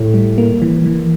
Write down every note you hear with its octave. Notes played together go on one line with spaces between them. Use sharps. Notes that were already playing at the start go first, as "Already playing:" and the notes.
Already playing: A2
G3
A#3
E3
E3